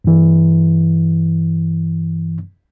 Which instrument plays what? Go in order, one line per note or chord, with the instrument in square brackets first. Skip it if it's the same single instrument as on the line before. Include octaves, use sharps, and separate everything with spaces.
[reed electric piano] G2 E3